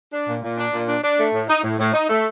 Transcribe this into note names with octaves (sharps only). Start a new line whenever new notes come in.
D4
A#2
A#2
D4
A#2
D4
D4
A3
A2
D#4
A2
A2
D#4
A3